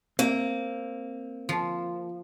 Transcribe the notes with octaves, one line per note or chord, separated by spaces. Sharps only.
A#3 C4
F3